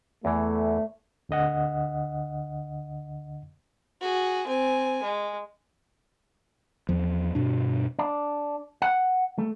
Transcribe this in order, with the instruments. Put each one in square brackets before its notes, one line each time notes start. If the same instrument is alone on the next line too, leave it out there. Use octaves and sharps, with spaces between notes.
[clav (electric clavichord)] E2 E3 [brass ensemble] A3
[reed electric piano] D2 D3 D#5 F#5
[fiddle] F#4 G#4
C4 G#5
G#3
[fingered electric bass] E2 F3
G2 B2 D4
[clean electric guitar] D4
F#5
A3